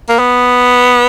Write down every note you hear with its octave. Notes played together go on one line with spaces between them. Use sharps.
A#3
B3